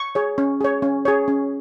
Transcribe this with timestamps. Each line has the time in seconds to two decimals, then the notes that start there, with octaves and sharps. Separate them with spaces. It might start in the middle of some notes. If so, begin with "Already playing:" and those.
Already playing: C#6
0.15 G#4 C#5
0.38 C#4
0.61 G#4 C#5
0.82 C#4
1.05 G#4 C#5
1.28 C#4